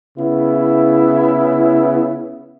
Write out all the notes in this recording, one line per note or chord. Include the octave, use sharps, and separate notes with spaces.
C#3 B3 E4